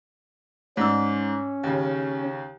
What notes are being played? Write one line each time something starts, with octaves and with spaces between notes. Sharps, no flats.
G#2 C#4 D5 E6
D#2 C#3